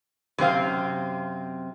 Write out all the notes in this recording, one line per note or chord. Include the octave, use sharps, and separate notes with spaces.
F#2 C3 C4 F5